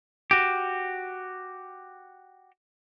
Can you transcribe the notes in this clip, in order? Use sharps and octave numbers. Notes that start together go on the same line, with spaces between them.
F#4 G4